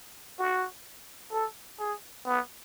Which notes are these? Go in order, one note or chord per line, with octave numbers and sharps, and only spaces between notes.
F#4
A4
G#4
B3